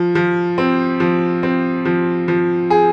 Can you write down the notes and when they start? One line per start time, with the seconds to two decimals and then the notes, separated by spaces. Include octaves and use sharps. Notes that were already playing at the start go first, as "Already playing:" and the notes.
Already playing: F3
0.15 F3
0.58 C4
1.00 F3
1.43 C4
1.85 F3
2.28 F3
2.70 G#4